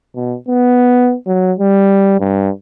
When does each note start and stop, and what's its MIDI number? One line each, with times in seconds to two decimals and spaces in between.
0.15 0.36 47
0.48 1.15 59
1.27 1.52 54
1.59 2.20 55
2.20 2.50 43